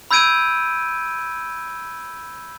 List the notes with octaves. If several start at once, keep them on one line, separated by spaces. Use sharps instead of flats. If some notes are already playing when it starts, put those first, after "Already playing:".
B5 E6 G6 G#6 D7 D#7